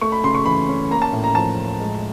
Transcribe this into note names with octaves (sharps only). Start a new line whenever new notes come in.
A3 C#6
B5
C#3 C6
C#6
E3 B5
C#4
A#3 A#5
A5
A2
A#5
F3 A5
A2
G#3